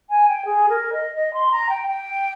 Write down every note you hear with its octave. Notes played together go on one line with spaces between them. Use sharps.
G#5
G5
G#4
A#4
D#5
D#5
C6
A#5
G5
G5